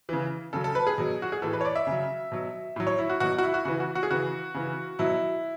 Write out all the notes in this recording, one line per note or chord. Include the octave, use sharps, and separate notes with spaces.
C#3 E3
C#3 F#3 A4
A4
B4
G#4
B2 F#3
F#4
G#4
A2 E3 A4
B4
C#5
D5
E5
C#3 F#3
B2 F#3
A2 F#3
C#5
E4
F#4
B2 F#3 F#4
F#4
E4
F#4
C#3 E3 F#4
F#4
F#4
G#4
C#3 E3 F#4
C#3 E3
B2 F#3 E4